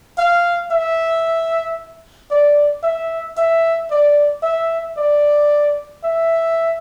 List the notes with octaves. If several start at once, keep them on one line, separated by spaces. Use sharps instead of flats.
F5
E5
D5
E5
E5
D5
E5
D5
E5